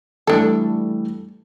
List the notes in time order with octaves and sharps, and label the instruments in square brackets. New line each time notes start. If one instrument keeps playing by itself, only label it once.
[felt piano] E3 G3 A3 [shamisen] D4 A4